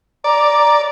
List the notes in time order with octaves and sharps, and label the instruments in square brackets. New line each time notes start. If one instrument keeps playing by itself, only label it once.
[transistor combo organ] D5 [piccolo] A#5